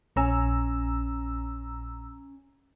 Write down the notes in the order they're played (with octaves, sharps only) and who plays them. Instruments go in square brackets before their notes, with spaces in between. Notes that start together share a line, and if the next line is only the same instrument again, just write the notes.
[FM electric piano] A#1 A#5 E6 [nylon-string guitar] C#4 G#5